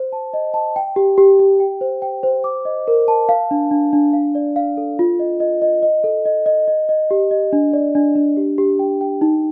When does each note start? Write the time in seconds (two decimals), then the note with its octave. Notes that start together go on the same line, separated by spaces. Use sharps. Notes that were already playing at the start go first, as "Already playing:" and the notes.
Already playing: C5
0.12 A5
0.34 D#5
0.54 A5
0.76 G5
0.96 G4
1.18 G4
1.39 G4
1.60 G5
1.81 C5
2.02 G5
2.23 C5
2.44 D6
2.65 D#5
2.88 A#4
3.08 A5
3.29 F5
3.51 D4
3.71 D4
3.93 D4
4.13 F5
4.35 D5
4.56 F5
4.77 A4
4.99 F4
5.19 D#5
5.40 D#5
5.62 D#5
5.83 D#5
6.04 A4
6.25 D#5
6.46 D#5
6.68 D#5
6.89 D#5
7.11 G4
7.31 D#5
7.53 D4
7.73 D5
7.95 D4
8.16 D4
8.37 G4
8.58 G4
8.79 G5
9.01 G5
9.21 D#4